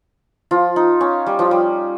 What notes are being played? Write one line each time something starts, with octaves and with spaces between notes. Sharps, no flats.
F3 F4
D#4
C#4
G3
F3
G3